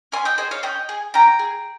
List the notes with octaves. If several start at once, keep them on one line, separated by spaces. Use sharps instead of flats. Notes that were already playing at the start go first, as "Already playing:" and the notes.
C#4 G#5 C6
D#5 G5
G#4 C5 D#5
C#5 F5
C#4 D#5 G5
G#4
C#4 G5 A#5
G#4